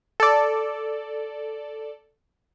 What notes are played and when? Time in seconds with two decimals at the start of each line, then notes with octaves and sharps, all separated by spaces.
0.20 A4 D5